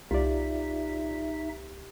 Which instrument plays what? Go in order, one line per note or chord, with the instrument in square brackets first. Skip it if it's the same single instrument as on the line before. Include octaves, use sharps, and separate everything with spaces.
[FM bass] C2 [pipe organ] D#4 E5 [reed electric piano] F4 D5 [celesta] G4